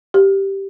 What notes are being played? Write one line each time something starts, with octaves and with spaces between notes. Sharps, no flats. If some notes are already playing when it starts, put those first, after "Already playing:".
G4